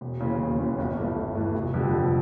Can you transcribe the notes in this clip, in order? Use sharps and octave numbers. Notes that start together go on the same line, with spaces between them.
E1
D#2 C#3 E3
E1
D#2 C#3 E3
G1
G2 E3 A3
G1
G2 E3 A3
F1
F2 D3 G3
F1